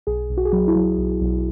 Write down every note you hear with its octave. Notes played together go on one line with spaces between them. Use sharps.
B1 G#4
B1
F#4
G#4
F#3 F#4
E4
F#3
B1
B1